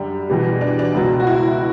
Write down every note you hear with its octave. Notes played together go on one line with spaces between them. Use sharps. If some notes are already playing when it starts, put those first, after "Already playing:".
Already playing: F#2 D3 G3
E2 B2 G3
D4
D4
C#2 B2 F#3
F#4
E4